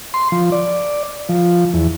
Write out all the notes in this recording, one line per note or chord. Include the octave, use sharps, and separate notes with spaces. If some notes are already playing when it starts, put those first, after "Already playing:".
C6
F3
D5
F3
E2